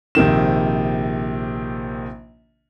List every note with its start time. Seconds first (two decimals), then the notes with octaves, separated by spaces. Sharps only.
0.15 A#1 C3 D#3 E7